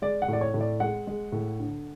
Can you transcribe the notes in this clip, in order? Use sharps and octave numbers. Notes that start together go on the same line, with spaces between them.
G#3 D5
F#5
A2 D5
C#5
A2
D5
G#3 F#5
G#3
A2
D3